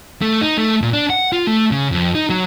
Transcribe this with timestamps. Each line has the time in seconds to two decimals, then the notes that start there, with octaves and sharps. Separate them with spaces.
0.22 A3
0.41 D#4
0.58 A3
0.82 A#2
0.93 D4
1.10 F#5
1.33 F4
1.47 A3
1.71 C#3
1.91 F2
2.15 D#4
2.30 F#3